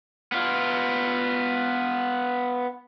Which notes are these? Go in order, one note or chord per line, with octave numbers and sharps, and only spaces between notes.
B3 F4